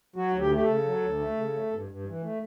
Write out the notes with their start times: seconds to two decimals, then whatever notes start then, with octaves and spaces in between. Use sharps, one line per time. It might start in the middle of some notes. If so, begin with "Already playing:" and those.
0.16 F#3 F#4
0.33 D2
0.39 G4
0.51 A3 G4
0.62 A4
0.68 C#3
0.85 F#3
1.02 D2
1.19 A3
1.37 C#3
1.53 A3
1.71 G2
1.88 G2
2.06 E3
2.22 A3